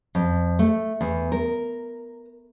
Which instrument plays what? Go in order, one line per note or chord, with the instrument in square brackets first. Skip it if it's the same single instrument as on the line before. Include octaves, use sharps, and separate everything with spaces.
[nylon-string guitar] F2
A3
E2
A#4